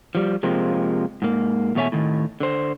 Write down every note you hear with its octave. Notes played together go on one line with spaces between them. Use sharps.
F3 G3
C3 F3 G#3 A#3 C4
G#2 A#3
E2 B2 A3 C#5 E5 G#5
A2 D#3
D3 C5